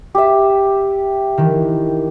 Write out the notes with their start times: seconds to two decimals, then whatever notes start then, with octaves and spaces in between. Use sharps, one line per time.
0.15 G4 E5
1.38 D#3 E3